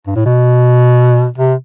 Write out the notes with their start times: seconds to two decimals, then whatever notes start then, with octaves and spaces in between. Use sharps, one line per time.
0.07 G2
0.16 A2
0.26 B2
1.38 C3